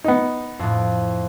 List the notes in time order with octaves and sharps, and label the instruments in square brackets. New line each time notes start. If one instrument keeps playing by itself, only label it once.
[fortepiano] B3 D#4
[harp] F2 A2